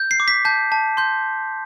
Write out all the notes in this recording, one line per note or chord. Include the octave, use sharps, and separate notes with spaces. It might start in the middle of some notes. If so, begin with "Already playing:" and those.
Already playing: G6
C7
D6
B6
A5 G6
A5
C6 G6